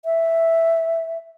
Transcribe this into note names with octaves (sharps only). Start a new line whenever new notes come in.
E5